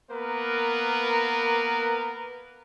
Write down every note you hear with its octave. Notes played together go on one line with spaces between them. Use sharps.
A#3 B3 A#4 B4